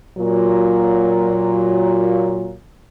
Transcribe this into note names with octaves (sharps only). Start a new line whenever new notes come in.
A#2 F#3 F4